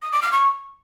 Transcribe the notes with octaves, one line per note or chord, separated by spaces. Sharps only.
D#6
D6
F6
C#6